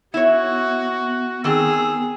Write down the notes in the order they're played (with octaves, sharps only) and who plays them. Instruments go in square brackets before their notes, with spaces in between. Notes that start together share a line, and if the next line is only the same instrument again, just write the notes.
[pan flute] B3 [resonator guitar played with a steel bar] E4 C#5 [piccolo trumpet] F#4
[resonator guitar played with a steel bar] D#3 C4 [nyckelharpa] G#4 [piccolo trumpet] E6